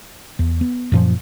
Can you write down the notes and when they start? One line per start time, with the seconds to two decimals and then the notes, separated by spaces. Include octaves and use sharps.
0.39 E2
0.61 B3
0.92 F#2 A#2 F3